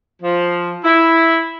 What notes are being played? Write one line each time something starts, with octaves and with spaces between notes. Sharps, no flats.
F3
E4